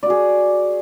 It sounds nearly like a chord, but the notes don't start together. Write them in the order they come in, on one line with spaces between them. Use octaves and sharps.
D5 F#4 G#4